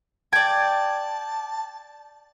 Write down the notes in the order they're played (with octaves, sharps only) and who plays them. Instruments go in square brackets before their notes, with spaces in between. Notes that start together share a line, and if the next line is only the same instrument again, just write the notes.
[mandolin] D5 G5 [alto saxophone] A5 [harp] G#6